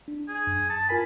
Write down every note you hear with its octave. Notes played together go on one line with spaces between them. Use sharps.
D4
G#4
F#2
A5
F4 A#4 G#5 B5